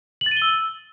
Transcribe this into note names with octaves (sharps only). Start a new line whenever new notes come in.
F#7
A6
D#7
G7
E6